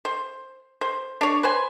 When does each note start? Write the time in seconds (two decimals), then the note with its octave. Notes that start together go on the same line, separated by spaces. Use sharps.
0.05 C5
0.81 C5
1.21 D4 C#5
1.43 B4 C5 G#5